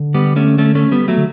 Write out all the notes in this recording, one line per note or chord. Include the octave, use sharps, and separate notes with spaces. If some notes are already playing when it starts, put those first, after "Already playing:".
Already playing: D3
G3 B3
A3 C#4
A3 C#4
A3 C#4
G3 B3
F#3 A3
D3